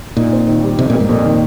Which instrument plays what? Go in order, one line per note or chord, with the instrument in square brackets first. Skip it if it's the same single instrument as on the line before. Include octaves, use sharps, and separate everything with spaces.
[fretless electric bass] A#2 [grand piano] D#4
[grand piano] C4
D#3
G3
[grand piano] F2 [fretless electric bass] C3
[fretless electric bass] A#2 [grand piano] A#3
[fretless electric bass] G#2
[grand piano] F2 [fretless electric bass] A#2
[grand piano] D#3